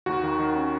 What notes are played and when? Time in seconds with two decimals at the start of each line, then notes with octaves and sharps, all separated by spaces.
0.06 D#2 F#4
0.23 D#3
0.39 D#3
0.55 C#4